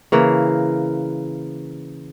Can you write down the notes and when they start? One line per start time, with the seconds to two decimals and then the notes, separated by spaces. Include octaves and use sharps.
0.12 C#3 E3 A#3